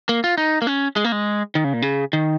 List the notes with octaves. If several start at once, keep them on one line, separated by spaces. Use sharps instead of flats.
A#3
F4
D#4
A#3
C#4
G#3
A#3
G#3
D#3
C#3
A#2
C#3
D#3